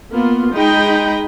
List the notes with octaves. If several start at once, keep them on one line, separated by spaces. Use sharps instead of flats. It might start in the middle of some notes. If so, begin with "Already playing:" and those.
A#3 B3 F4
G#3 D#4 G#4 D#5 G5 B5